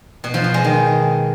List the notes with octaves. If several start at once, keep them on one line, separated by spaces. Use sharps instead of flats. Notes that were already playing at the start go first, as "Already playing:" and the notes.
B2
F3
B2
G#3
D#3